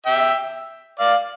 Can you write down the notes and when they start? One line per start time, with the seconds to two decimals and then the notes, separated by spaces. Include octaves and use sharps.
0.06 E5 G5
1.00 D5 F5